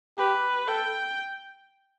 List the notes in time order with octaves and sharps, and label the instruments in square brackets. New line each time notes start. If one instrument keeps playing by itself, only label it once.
[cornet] G4 [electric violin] B4
[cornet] A4 [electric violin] G5